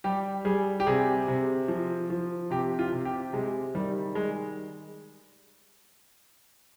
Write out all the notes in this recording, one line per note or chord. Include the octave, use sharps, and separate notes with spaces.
G3 G4
G3 G#4
G4
C3 G#4
C3
F3
F3
C3 G4
F4
C3
G4
C3 G#3
D#3 G3
G3 G#3